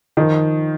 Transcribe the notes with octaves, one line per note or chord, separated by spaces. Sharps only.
D#3 F3 D#4